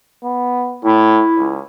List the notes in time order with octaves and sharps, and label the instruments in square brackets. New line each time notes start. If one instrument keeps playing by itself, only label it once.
[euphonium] B3
[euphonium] A2 [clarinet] E4
[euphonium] C#2